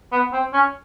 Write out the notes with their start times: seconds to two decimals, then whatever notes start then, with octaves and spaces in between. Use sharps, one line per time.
0.12 B3
0.33 C4
0.53 C#4